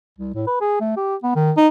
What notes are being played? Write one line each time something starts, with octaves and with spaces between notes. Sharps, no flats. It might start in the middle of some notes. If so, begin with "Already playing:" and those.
C2
A2
B4
G#4
A3
G4
B3
D#3
D#4